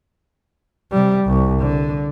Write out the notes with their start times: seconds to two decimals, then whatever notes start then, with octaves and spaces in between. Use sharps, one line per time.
0.92 C3 G3
1.25 C2
1.59 D3